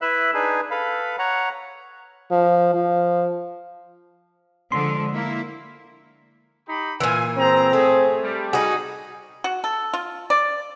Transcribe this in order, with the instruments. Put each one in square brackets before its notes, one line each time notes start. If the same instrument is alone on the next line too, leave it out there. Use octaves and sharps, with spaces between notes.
[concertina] E4 B4 E5 E6 F#6
D4 D#4 G#4 B4
A4 B4 F5 B5
C#5 F#5 A#5
[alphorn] F3
F3
[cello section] D3 F3 G#3 [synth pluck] C6
[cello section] A#3 E4
[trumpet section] D#4 G4 B5
[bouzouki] A#2 E3 [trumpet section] F4 G#5
[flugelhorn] C4 [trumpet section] G#4 C5 A#5
[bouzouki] A3 [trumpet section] G#4
[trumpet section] G3
[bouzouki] D#4 F#4 [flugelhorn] G#4
[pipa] F#4
A4
F4
D5